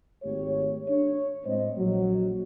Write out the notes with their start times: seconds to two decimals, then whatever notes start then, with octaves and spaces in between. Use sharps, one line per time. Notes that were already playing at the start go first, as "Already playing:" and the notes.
0.23 G#1 A3 G4 C#5
0.88 D4 C#5
1.45 A2 G#3 C4 C5 D#5
1.77 A#1 F#3